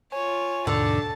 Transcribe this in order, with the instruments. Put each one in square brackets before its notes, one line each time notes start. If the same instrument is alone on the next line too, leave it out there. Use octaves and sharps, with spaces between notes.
[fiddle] F4 C#5 [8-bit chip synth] G#5
[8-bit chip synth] D#2 G#2 B2 [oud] D3 [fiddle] A5